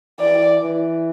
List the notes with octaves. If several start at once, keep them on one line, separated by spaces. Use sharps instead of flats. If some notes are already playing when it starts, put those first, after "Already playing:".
E3 D5
E3